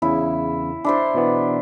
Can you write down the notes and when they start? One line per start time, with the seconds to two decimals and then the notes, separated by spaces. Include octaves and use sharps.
0.02 E2 C#3 E4
0.84 D4 E4 C5
1.14 B2 E3 B3